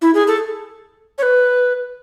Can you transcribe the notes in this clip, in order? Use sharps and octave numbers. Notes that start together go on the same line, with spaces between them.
E4
G#4
A4
C#5
B4